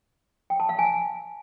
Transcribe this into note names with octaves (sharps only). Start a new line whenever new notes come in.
G5
A5
F5
G#5